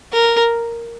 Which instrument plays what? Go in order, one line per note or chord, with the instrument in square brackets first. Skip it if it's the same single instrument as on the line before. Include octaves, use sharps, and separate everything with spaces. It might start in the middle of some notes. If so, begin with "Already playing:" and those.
[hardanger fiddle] A#4